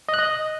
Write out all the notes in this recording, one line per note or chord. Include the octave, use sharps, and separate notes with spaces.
D#5
F#6
D#5